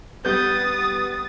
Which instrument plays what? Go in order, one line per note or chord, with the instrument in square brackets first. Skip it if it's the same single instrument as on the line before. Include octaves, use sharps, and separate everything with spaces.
[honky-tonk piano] G3 B3 [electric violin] D#6 A6 [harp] G6